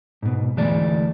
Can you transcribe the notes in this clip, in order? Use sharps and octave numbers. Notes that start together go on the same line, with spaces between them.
G#2 B2
D2 E3 G#3 A3 D5